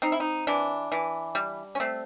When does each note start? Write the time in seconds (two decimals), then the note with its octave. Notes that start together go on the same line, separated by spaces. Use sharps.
0.02 C4 D#4
0.12 E4
0.20 D#4
0.47 E3 D4
0.92 E3
1.35 G3
1.75 C#4
1.80 A3 C4